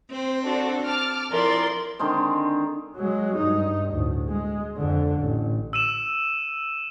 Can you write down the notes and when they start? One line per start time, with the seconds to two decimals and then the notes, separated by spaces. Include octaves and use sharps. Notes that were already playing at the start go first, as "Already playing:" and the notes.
0.11 C4 C5
0.43 D4 F#4 A4
0.86 A5 D6 F6
1.31 F3 E4 A#4 D5 C6
1.99 D3 D#3 G#3 C4
2.96 F#3 G#3
3.37 G2 D#4
3.94 D2 A2
4.28 G#3
4.77 F2 D3
5.20 A1
5.73 E6 D#7 E7